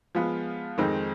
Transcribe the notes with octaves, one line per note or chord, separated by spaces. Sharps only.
F3 G#3 B3 F4
F2 D#3 G#3 C4 D#4